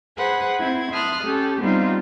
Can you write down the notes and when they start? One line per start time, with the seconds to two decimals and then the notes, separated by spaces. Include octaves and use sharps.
0.17 G#4 B4 C5 F#5 G#5
0.58 C4 E4 G#6
0.91 E5 A5 C6 D#6 F6 F#6
1.25 C#4 G4 A4
1.61 G3 B3 C4 D#4 F4